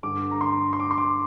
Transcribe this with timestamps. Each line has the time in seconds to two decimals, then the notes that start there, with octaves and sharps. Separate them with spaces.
0.03 G2 D3 D6
0.31 A#5
0.41 C6
0.73 C6
0.80 D6
0.91 C6
0.98 D6